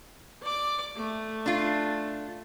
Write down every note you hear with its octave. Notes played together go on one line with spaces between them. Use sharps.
D5 D6
A3
D4 F4